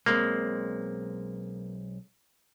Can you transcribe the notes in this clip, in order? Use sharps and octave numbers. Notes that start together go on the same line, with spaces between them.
B1 G#3 A#3 C4